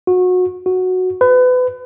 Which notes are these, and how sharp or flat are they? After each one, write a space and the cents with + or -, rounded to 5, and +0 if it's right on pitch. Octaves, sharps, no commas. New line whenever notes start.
F#4 -25
F#4 -5
B4 +30